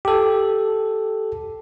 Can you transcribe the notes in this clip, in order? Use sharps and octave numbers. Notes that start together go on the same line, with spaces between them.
G4 A4